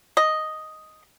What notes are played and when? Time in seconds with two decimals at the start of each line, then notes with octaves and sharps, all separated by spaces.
0.17 D#5